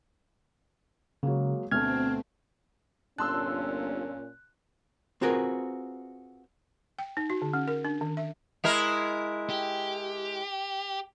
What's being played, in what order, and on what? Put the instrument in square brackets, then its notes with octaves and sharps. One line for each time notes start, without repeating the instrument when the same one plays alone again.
[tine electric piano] C#3 [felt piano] F#3 G#3 A#3
[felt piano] D2 B2 A3 [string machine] C4 [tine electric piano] F6 G#6
[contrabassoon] G1 [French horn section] A#2 C#4 [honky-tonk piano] A5 C6 E6 [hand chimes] F#6
[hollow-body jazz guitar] C4 F4 F#4 G#4 A#4 B4
[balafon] G5
D#4
F#4
D3
C#4
A#4
D4
D#3
E5
[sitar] G#3 E4 A#4
[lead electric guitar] G4